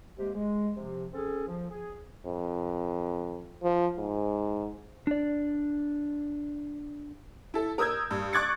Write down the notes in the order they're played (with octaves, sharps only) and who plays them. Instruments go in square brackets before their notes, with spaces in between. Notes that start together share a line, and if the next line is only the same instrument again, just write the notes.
[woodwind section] C3 G#3 A#3 G4
G#3
C3 F3
C4 C#4 G#4 A4
F3
G#4
[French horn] F2
F3
G#2
[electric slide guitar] D4 D5
[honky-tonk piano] E4 A4
A#4 D#6 E6 G6 G#6
G2
C#6 D6 F#6 G#6 A6 C#7